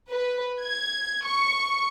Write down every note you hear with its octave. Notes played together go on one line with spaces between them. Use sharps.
B4
G#6
C#6